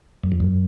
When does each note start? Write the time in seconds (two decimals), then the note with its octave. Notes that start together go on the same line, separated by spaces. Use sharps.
0.24 F#2
0.32 F2
0.40 F#2